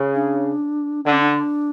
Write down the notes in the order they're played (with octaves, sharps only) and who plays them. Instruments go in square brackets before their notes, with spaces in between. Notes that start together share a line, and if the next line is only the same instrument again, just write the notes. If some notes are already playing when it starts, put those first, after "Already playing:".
Already playing: [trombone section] C#3
[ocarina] D4
[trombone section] D3 [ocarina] D4
[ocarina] C#4
D4